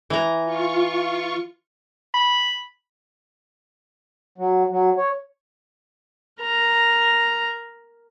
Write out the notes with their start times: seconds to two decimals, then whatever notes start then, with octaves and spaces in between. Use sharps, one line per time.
0.10 E3 A#5
0.45 F4 C#6
2.14 B5
4.38 F#3
4.70 F#3
4.97 C#5
6.41 A#4 A#5